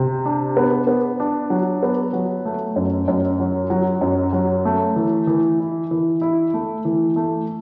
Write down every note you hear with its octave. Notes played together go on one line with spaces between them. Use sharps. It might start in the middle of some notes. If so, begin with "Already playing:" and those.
Already playing: C3
D4
B3
B3
D4
F#3
B3
F#3
A3
F#2
F#2
F#3
F#3
F#2
F#3
A3
E3
E3
E4
E3
E4
A3
E3
A3